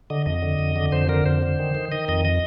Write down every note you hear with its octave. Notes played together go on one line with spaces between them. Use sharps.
D3 D#5
F2 D#5
D3
F2
D3
F2 C5
D3 A#4
F2 C5
D3
D#3
D#3
D#3 D#5
F2 D#5
D#5